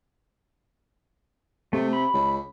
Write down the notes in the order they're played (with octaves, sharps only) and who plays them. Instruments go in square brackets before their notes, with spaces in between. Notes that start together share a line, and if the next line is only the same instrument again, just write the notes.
[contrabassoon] C3 [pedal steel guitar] A3
[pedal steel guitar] B5
[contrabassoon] C#2